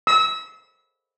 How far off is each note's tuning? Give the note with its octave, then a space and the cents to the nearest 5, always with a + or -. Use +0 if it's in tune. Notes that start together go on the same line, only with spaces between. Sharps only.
E6 -30